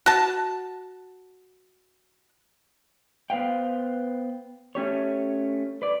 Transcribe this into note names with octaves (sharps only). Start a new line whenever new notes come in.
F#4 A5
B3 B4 C5 F5 G5
A3 C#4 G4 C#5
B4 D5